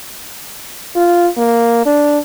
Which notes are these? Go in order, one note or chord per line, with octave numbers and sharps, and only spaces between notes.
F4
A#3
D4